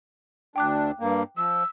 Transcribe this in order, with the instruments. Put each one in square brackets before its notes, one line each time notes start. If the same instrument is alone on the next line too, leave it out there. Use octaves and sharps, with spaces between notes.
[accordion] D2 D4 [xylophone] G5 D6 F#6
[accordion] G2 A#3
[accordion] F3 [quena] E6